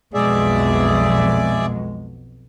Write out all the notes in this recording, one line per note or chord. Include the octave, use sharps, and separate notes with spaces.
B1 F2 B2 G#3 G#4 D5 E5